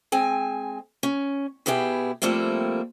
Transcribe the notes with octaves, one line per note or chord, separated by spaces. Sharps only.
G#3 C4 G#5
C#4
B2 B3 E4 G4 G#4
F3 G3 A3 A#3 C4 E4